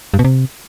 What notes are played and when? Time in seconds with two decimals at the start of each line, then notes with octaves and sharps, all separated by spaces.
0.14 G2
0.19 B2
0.24 C3